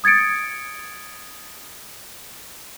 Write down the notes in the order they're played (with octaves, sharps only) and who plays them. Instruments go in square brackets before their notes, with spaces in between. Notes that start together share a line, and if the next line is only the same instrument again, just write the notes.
[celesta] D#6 G#6 A6 C#7 D7